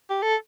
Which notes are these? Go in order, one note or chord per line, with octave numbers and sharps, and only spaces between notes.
G4
A4